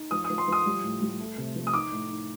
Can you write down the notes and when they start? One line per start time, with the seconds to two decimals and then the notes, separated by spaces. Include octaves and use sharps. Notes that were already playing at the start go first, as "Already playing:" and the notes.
Already playing: D#4
0.11 F3 D#6
0.24 D#6
0.30 F3
0.38 C6
0.48 F3 D#6
0.66 G3
0.84 A2
1.02 G3
1.20 A3
1.38 C3
1.56 F3
1.67 D#6
1.73 D#4 D6
1.92 A2
2.11 D#4